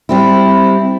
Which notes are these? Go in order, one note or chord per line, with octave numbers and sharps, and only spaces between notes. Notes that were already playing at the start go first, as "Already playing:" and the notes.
G3 C4 E4